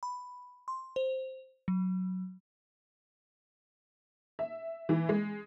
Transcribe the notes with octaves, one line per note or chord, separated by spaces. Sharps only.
B5
C6
C5
F#3
E5
E3
G#3